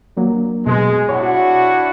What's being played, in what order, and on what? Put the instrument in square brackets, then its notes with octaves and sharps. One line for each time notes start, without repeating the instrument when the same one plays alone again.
[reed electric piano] F#3 A#3 D4
[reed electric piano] B2 [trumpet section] G#3
[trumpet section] D4 E4 F#4 [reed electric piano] C#5